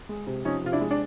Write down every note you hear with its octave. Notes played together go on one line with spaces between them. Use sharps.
G#3
C3
F3 C#4 D#4
C3 F4
D4 E4
G#3
D4